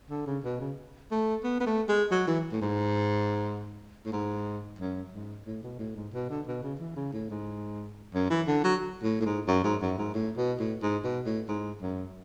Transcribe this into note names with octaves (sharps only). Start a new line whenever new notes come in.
D3
C#3
B2
C#3
A3
B3
B3
A3
G#3
F#3
E3
A2
G#2
A2
G#2
F#2
G#2
A2
B2
A2
G#2
B2
D3
B2
C#3
E3
C#3
A2
G#2
F#2
E3
D3
F#3
A2
A2
G#2
F#2
G#2
F#2
G#2
A2
B2
A2
G#2
B2
A2
G#2
F#2